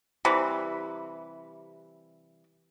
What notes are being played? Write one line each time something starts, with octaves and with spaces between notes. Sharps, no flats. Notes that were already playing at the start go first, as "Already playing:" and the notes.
C3 E3 G3